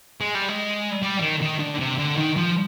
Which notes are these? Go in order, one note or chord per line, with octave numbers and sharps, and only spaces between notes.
G#3
G3
G#3
G3
D#3
D#3
D3
C3
D3
D#3
F3